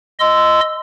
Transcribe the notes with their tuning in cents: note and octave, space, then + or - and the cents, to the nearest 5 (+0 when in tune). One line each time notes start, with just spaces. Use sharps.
D#5 +0 C6 -20 E6 +0